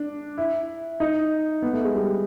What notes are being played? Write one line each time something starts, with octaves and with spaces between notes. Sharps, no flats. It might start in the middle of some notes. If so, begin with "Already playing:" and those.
Already playing: D4
E4
D#4
B3
A3
G#3
G3